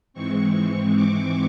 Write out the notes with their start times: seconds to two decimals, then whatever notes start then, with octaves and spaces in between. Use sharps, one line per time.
0.13 G#2 E3 G#3 C4 C#6
0.54 C#6
0.93 D6